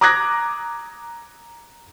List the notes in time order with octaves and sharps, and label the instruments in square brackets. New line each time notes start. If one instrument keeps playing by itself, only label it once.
[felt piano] A#5 D6 D#6 F#6 G#6 A#6